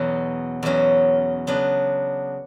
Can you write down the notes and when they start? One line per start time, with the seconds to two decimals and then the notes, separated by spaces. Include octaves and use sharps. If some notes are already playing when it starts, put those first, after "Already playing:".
Already playing: E2 B2 F#3 C#4
0.63 E2 B2 F#3 C#4
1.47 C#3 F#3 B3 D4